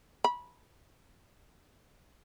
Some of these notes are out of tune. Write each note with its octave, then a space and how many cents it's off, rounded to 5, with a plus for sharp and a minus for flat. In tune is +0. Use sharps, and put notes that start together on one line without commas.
B5 -15